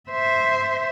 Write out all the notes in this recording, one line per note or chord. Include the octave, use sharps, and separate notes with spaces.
C5 E5